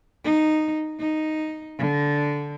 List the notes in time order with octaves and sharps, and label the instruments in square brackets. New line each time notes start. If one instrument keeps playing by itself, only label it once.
[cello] D#4
D#4
D3